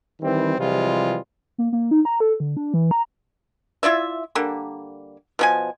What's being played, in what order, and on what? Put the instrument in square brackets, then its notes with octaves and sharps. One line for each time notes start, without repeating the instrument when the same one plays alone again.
[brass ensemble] D#3 E3 G3 C4
C3 E3 F3 G3 G#3 F4
[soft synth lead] A#3
A#3
D#4
A#5
A4
D3
D4
E3
A#5
[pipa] E4 F4 D5 E5
D3 G3 A#3
B2 F3 G#5